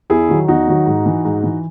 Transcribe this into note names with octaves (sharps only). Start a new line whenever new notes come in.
E2 E4 G#4
D#3 F#3
E2 D#4 F#4
D#3 F#3
G#2
E3
G#2
E3